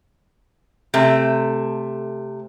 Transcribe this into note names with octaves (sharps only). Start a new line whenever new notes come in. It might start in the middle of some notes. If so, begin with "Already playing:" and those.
C3 A3